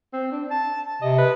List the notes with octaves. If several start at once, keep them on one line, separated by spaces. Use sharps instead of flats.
C4
D4
A5
C3 D#5
B4